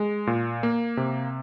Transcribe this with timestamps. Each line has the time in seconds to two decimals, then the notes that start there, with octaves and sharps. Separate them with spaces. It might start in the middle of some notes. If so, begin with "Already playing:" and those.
Already playing: G#3
0.27 A#2
0.63 A#3
0.97 C3